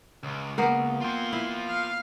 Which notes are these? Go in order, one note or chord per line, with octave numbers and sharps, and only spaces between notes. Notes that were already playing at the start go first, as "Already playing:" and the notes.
C#2
A#3 B3 A#4
F4 G5 C6
E4
F5